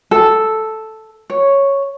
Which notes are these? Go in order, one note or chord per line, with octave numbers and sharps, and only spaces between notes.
A4
C#5